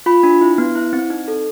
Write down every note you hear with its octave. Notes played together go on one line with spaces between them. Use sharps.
F4 B5
D4
E4
B3
E4
C4
D#4
A4